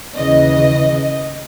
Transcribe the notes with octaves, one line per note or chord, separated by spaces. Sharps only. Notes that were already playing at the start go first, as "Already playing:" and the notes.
D#2 C#3 E3 D#5